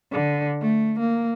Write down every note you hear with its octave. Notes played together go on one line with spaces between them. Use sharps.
D3
A3
A#3